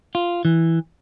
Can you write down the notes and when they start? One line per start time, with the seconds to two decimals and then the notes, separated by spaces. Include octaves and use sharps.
0.15 F4
0.45 E3